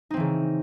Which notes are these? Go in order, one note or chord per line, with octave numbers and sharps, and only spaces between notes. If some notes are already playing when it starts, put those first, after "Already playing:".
C#3 E3 C4 D#4